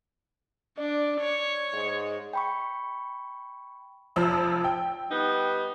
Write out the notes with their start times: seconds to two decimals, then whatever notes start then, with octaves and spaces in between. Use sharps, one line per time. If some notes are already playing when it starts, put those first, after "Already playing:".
0.78 D4 D5
1.20 C#5
1.73 G#2
2.33 G5 B5 C#6
4.16 F1 F3 E6
4.64 G5
5.10 G3 B3 D#4